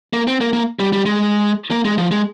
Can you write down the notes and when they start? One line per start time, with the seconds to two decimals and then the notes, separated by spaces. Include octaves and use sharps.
0.13 A#3
0.27 C4
0.41 A#3
0.53 A#3
0.79 G3
0.93 G3
1.06 G#3
1.71 A#3
1.85 G#3
1.98 F3
2.12 G#3